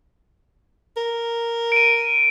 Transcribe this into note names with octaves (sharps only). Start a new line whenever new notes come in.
A#4
D7 D#7